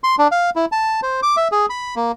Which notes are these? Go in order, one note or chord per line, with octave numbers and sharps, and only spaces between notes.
C6
D4
F5
E4
A5
C5
D6
E5
G#4
B5
A#3